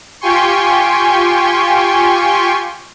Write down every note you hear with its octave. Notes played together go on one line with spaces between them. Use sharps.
F4 G4 G5 G#5 C6 C#6